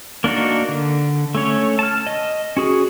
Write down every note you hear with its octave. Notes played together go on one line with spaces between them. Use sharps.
A#3 D4 D#4 F#4
D3
A3 C#4 C#5
A5 F6
D#5
C#4 F#4 G#4